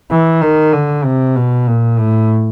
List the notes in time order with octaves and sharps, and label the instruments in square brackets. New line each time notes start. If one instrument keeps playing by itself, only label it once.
[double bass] E3
D#3
D3
C3
B2
A#2
A2